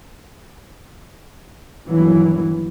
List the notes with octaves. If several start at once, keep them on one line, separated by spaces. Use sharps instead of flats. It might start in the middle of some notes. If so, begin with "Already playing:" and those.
G1 D#2 E3 F#3